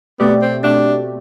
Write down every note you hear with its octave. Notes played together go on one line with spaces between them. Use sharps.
B2 A3 B3 C4 G4 D5
C4
B2 A3 C4 D4 G4 D5